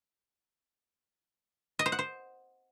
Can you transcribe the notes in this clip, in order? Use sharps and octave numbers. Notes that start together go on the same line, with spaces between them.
D#5
C5
F#5
C5